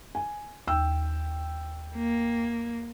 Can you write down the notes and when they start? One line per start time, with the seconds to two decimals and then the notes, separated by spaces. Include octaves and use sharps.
0.15 G#5
0.68 D#2 G5 E6
1.95 A#3